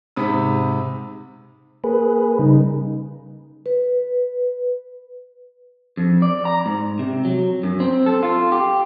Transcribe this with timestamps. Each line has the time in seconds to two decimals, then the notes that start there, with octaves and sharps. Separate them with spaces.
0.16 G#2 C3 B5 D#6
1.84 A#3 G#4 B4
2.39 C#3 G3 D#4
3.66 B4
5.97 F2
6.22 D5
6.45 A#5
6.66 G#2
6.99 C3
7.25 F#3
7.63 F#2
7.80 C4
8.06 A4
8.23 F4
8.52 G4